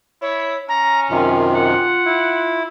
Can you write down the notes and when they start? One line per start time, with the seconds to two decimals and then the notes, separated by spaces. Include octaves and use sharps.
0.22 E4 C#5
0.69 C#4 A#5
1.10 F#2 C3 D#3 F4
1.56 F#5
2.05 E4